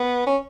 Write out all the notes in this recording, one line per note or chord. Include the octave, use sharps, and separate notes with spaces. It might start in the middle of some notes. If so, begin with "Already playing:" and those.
Already playing: B3
C#4